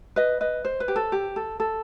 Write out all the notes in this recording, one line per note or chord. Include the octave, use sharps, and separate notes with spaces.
B4 D#5
B4 D#5
C5
B4
G4
A4
G4
A4
A4